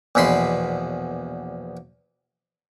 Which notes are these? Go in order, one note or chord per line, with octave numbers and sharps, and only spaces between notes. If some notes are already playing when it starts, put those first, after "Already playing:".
A#1 E2 B2 B5 C6